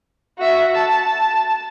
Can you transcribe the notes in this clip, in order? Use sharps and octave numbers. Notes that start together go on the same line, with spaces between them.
F#4 E5
A5